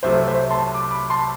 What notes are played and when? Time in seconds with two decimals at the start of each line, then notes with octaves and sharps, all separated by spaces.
0.03 C2 C3 F#3 A3 C5 E5
0.27 C5 E5
0.51 A5 C6
0.74 D6
0.91 B5 D6
1.10 A5 C6